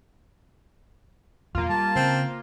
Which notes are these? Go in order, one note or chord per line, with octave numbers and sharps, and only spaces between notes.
E2 B2 F3 A#3 F4
G3 A5
C#3 C4